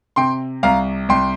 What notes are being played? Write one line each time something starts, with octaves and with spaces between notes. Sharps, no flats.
C3 G5 C6
C2 F5 A#5
C2 G5 C6